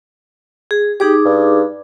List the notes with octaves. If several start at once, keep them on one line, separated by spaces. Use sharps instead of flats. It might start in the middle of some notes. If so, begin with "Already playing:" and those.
G#4
D#4 G4 G#4 D6
G2